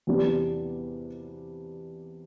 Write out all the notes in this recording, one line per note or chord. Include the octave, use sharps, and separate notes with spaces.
E2 C3 G3 D4